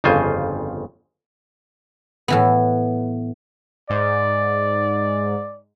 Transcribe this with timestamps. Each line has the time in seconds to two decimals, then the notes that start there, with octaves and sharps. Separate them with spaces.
0.04 G1 F2 C#3 F4 C5 G#5
2.28 A2 E3 B3
3.90 G#2 D5